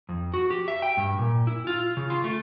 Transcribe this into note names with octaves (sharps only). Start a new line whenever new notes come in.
F2
F#4
G4
E5
G5
G2
A#2
E4
F4
C#3
F4
A3